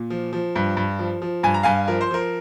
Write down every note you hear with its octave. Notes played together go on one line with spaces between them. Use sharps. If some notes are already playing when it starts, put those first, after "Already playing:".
Already playing: A#2
F3
F3
G2
G2
F3
F3
G2 G#5
A#5
G2 F5 G#5
F3 A#4
C5
F3 A#4